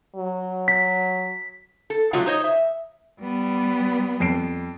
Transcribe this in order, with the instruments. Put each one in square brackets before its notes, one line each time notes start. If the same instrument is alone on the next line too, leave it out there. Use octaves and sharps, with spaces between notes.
[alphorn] F#3
[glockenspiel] B6
[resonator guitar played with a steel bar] A4
C3 F3 F#3 G#3 F4 F#4
D#4 C5 C#5 D#5
E5
[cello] G3 B3
[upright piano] F2 C7 D7